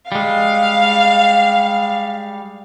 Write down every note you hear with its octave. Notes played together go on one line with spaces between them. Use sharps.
G3 G#3 F5